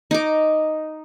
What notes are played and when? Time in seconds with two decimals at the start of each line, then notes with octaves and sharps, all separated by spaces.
0.11 D#4 D6